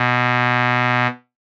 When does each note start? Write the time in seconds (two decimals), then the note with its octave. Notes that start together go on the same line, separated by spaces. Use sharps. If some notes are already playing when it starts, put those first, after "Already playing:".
Already playing: B2